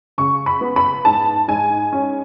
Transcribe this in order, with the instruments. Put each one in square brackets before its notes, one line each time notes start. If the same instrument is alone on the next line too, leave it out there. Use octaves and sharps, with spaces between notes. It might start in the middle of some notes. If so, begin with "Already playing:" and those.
[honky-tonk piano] C#3 C#6
B5
B3
B5
G#2 A5
G#2 G#5
C#4